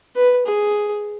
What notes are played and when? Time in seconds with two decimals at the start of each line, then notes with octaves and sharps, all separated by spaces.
0.15 B4
0.46 G#4